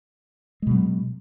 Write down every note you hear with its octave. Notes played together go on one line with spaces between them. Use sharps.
B2 F#3 G#3